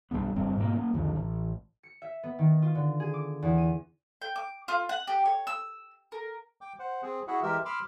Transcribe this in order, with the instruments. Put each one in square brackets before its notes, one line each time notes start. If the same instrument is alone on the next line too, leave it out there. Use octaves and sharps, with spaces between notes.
[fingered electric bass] B1 E2 G2 B3
F#1 G2 C4
G#2 B2 A#3
A#3 C#4
C2 F2 D3 D#3
A1
[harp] C#7
E5
B3
D#3
F4
D3
G#4
D6
E2
D#7
[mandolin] G5
D6
F4
F#5
G4
C#5
E6
A#4
[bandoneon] G5 D6
C5 F#5
C4 G#4
E4 F#4 G#4 E5 F#5
E3 G#3 G4 A#4 E5 E6
B5 C6 D6 E6 F6